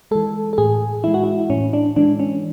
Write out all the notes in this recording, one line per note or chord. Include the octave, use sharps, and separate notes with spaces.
E3 G#3 A4
A4
A2 G#4
E3 G#3 E4
F#4
E4
A2 C#4
D4
E3 G#3 D4
C#4